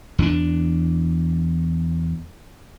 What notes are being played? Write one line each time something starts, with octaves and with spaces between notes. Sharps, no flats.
E2 C#4 D4